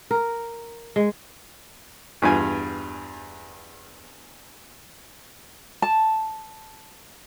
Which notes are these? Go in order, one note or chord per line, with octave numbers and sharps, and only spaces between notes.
A#4
G#3
E2 G2 F4 G#5
A5